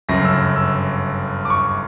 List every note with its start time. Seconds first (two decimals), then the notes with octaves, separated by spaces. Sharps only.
0.09 G1 F#2 C#3 A#6
0.25 E6
0.56 E6
1.45 D6
1.50 C#6